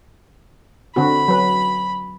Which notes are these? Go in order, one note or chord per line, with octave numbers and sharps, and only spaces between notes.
D3 C4 F#4 B5
F#3 B4